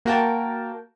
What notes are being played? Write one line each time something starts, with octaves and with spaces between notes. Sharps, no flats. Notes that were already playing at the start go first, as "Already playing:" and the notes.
A#3 F#4 A#4 G5 A5